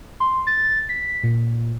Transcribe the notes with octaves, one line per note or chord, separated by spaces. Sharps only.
C6
A6
B6
A#2